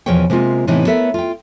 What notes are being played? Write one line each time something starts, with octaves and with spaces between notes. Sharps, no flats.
E2 B2 F3 G#4 C#5 G5
C3 G#3 A#3 F4
A2 C3 E3 B3 D#4
B3 A4 A#4 C#5 E5
F4 G5